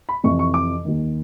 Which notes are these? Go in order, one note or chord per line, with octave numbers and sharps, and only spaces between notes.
B5
F2 C3 E3 C#6
C#6
D6
D#2 D#3